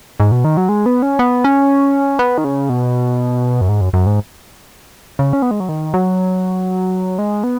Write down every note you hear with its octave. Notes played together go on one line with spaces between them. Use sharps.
G#2
B2
D#3
F#3
G#3
B3
C#4
B3
C#4
B3
D#3
C#3
B2
F#2
G#2
F#2
F#2
G#2
C#3
C#4
B3
G#3
F#3
D#3
F#3
G#3
B3